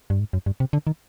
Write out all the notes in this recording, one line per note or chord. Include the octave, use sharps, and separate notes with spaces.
G2
G#2
F#2
G2
C3
D3
D#3